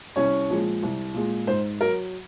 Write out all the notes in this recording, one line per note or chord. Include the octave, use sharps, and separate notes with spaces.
C2 C#4 C#5
A#2 F3 G#3
C2
A#2 G#3
G#2 C5
F#3 A#4